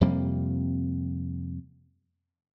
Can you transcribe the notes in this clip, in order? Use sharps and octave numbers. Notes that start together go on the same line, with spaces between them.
F2 C3 G3 A#3